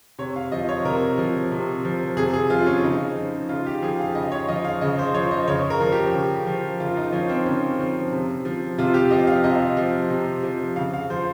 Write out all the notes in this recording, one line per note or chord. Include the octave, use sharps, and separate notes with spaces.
C3 C#5
F5
F3 D#5
C#5
C3 A#4
F3
C3
F3
C3 G#4
G#4
F3 F4
C#4
C#3 D#4
F3
C#3 F4
G4
F3 G#4
F5
C#3 D#5
C#5
F3 D#5
F5
C#3 D#5
C5
F3 C#5
D#5
C#3 C#5
A#4
F3
G4
C#3
F3
C#3 F4
D#4
F3 C#4
C4
C#3 C#4
F3
C3
F3
C3 F4
G4
F3 D#5
F5
C3 D#5
F3
C3
F3
C#3 F5
F5
F3 C5